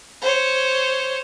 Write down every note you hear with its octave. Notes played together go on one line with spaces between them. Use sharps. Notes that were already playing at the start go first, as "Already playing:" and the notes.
C5 C#5